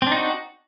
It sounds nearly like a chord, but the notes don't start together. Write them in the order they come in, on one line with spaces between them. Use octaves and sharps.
C4 D4 D#4 F#4